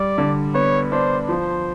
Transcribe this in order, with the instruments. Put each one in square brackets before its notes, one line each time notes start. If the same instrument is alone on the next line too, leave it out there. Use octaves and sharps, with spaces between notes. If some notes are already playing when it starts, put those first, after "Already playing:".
Already playing: [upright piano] G3 [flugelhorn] D5
[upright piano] D3
[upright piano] B3 [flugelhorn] C#5
[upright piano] D4 [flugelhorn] C5
[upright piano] F3 [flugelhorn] C5